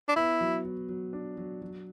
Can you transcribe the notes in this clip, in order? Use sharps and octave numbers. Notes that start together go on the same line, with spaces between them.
D4
B3 E4
F#3
F#3
F#3
D4
F#3
F#3